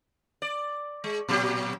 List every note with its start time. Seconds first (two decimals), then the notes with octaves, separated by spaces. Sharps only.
0.42 D5
1.04 G#3
1.29 A#2 F#3 G4